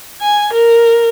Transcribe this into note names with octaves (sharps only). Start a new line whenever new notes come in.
G#5
A#4